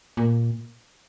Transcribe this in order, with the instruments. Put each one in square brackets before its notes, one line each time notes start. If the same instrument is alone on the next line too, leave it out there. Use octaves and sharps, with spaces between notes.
[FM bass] A#2